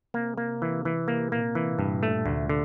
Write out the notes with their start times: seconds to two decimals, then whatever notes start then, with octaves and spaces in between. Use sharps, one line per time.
0.14 C3 A#3
0.37 A#3
0.61 C3 E3
0.85 E3
1.08 C3 A#3
1.32 A#2 A#3
1.55 C3 E3
1.79 G2 C3
2.02 A#2 A3
2.15 A#2
2.25 D2 C3
2.49 A#2 D3